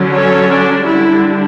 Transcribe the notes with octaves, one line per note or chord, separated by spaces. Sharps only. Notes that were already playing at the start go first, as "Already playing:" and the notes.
Already playing: D3 F#3 C#4
A4 C#5
D4
D3 G3 D4 E4